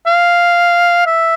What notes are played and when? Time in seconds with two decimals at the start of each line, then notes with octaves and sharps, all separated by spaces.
0.06 F5
1.06 E5